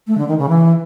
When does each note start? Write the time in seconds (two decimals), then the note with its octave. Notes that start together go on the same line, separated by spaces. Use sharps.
0.07 A3
0.17 D3
0.28 D#3
0.38 C#3
0.49 E3